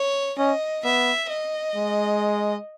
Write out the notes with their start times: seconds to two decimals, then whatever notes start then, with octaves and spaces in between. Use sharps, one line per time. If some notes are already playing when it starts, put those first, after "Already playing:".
Already playing: C#5
0.38 C#4 D#5
0.84 B3 E5
1.30 D#5
1.76 G#3